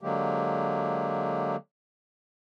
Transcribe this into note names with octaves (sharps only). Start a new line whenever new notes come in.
D3 F#3 G#3 A#3 G4